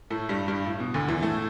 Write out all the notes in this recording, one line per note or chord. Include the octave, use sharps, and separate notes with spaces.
A2 A3
G2 G3
G2 G3
A2
B2
D2 D3
E2 E3
A2 A3